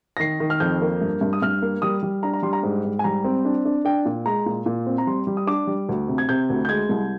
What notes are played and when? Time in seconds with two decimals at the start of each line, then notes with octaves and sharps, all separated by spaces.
0.17 A#6
0.20 D#3 C7
0.40 D#3
0.50 F6
0.60 F2 G6
0.82 A#3
1.01 G2
1.21 G2
1.33 D#6
1.42 G2 F6
1.62 A#3
1.82 G3 D#6
2.03 G3
2.23 D4 A#5
2.33 A#5
2.43 G3 C6
2.53 A#5
2.63 G#2
2.84 G#2
2.99 G#5
3.04 G3 A#5
3.24 C4
3.45 D4
3.65 D4
3.85 D4 G5
4.05 A#2
4.26 G#3 A#5
4.46 A#2
4.66 A#2
4.86 C4
4.98 A#5
5.07 G3 C6
5.27 G3
5.37 D#6
5.47 D4 D6
5.67 G3
5.89 D2
6.08 C3
6.18 G#6
6.29 C3 G6
6.50 D2
6.65 G6
6.69 G#3 G#6
6.89 C2